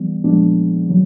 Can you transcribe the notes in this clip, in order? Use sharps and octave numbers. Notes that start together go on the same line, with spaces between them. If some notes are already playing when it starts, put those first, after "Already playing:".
Already playing: E3 G3 B3
A#2 F3 G#3 B3 D4
D#3 F#3